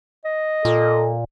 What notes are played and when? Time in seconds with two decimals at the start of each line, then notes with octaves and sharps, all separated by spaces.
0.25 D#5
0.65 A#2 A4